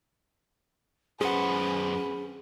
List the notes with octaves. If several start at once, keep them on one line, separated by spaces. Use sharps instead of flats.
F#2 C#4 G#4 B4 C5 F#5